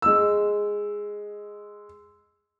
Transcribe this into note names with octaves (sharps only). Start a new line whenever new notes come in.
G#3 E6